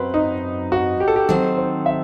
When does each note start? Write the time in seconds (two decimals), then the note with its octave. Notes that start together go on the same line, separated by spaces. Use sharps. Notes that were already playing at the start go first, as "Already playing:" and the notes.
Already playing: F#2 F#3 C4 B4
0.14 D#4
0.72 F#4
1.00 G4
1.08 A4
1.16 G4
1.28 D#3 F#3 C4 A4
1.58 C5
1.86 E5